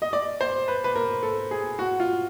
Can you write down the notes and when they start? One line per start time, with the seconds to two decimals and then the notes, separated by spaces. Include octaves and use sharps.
0.02 D#5
0.13 D5
0.41 C5
0.68 B4
0.84 B4
0.96 A#4
1.23 A4
1.51 G#4
1.79 F#4
2.00 F4